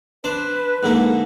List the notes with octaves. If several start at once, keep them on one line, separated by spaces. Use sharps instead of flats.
D4 B4 C5
G#2 D3 A#3